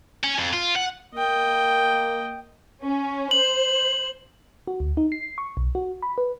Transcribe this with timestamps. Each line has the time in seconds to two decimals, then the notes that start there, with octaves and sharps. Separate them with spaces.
0.24 C#4
0.39 F2
0.53 F4
0.76 F#5
1.15 A#3 D#5 G5
2.83 C#4
3.31 C5 F#7
4.67 F#4
4.80 D2
4.97 D#4
5.12 C7
5.38 C#6
5.57 B1
5.75 F#4
6.02 B5
6.18 B4